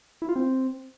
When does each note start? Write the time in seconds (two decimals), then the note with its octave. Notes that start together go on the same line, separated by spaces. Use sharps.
0.22 E4
0.29 F4
0.36 C4